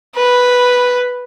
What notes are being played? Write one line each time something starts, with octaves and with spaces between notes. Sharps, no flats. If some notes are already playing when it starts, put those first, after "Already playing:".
B4